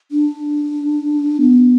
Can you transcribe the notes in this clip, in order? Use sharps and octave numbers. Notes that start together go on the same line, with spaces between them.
D4
B3